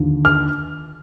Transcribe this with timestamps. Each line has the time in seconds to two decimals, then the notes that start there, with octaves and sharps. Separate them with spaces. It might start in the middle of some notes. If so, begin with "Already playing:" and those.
Already playing: D#2 D3 F3
0.25 F6